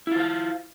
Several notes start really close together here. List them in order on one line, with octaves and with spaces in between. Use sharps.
E4 F4 C5 F5